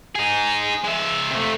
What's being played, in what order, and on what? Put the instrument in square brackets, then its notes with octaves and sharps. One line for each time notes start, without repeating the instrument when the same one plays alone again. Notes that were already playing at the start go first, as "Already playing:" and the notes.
[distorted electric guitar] D#4 G#4
G#3 E5
C3 A3